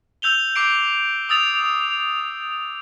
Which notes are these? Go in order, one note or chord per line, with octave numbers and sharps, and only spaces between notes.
E6 G6 F7 G7
D6 C7 D7
D#6 E6 A6 F7